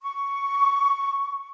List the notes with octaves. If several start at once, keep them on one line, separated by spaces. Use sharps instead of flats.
C#6